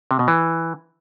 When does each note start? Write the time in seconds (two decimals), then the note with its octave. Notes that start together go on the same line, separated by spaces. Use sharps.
0.11 C3
0.19 B2
0.28 E3